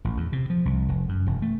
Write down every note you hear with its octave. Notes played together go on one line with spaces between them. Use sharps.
A1
E2
C3
F3
C2
F1
F#2
E1
A3